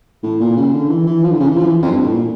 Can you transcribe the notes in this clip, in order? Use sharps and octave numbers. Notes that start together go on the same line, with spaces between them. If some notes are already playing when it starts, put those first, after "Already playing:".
A2
A#2
C#3
D3
E3
E3
F3
D3
C#3
E3
F3
E3
F2
G2
A2
A#2